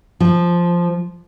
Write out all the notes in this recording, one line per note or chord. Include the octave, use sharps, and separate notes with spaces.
F3